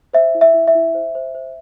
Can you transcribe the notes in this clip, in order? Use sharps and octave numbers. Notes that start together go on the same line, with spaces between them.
C5 E5
E4
E5
E4
E5
E4
C5
C5
C5